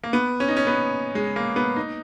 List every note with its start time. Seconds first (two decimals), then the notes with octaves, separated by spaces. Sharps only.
0.04 A#3
0.13 B3
0.40 C#4
0.49 D#4
0.57 C#4
0.67 B3
1.15 G#3
1.36 A#3
1.56 B3
1.76 D#4